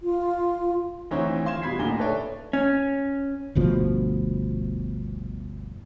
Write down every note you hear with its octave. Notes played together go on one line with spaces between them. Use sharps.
F4
D2 E3 C4 D#4 C#5 E5
E3 F4 C6 G#6 E7
G2 B2 B5 G#6 B6 C7
A1 D2 A#2 D#4 G7
A4 B4 C#5 D5 E5
C#4
G1 D2 B2 F3